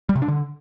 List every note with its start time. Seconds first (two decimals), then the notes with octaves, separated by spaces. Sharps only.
0.09 G3
0.16 C3
0.22 D4
0.28 D3